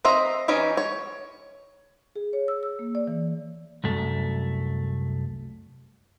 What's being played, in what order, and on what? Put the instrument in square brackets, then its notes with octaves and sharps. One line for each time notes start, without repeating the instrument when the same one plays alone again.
[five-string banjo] C4 C5 D#5 E5 A#5
E3 C#4 D#4 G4 C#5
C#5
[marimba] G#4
C#5
E6
E6
A#3
D5
E3
[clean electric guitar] C2 F#2 A3